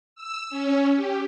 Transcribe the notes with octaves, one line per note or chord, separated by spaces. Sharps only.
E6
C#4
G4